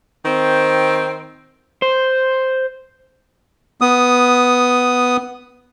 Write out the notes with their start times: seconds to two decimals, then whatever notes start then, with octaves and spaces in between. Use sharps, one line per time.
0.24 D#3 C4
1.82 C5
3.81 B3 D#6